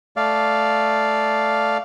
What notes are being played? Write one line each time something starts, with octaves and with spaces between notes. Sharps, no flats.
A3 D5 F5